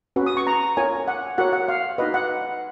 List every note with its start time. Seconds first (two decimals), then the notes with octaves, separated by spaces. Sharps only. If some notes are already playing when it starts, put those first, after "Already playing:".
0.16 C#4 F#4 B4
0.26 D#6
0.37 C#6
0.47 A#5
0.77 F4 A#4 C#5 G#5
1.08 F#5
1.38 F#4 A#4 C#5 F#5
1.53 F#5
1.68 F5
1.98 D#4 F#4 B4 D#5
2.14 F#5